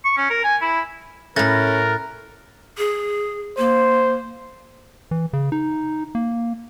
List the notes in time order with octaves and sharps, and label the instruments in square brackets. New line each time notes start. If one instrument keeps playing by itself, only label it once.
[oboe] C#6
C#4
A#4
G#5
E4
[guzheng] A2 A3 [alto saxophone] C#4 [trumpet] A#4 [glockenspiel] F#6 A6 A#6
[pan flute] G#4
[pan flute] A#3 [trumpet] C5
[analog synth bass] E3
C#3
D#4
A#3